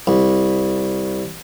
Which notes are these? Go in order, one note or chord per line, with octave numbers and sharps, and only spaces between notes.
C2